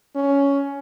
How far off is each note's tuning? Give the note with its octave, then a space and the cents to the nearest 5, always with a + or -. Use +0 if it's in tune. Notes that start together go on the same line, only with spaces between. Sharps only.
C#4 +10